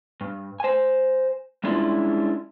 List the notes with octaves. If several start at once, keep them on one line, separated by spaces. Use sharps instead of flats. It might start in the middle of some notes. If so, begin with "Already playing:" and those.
G2
C5 G#5
G3 G#3 C#4 D4 E4 F4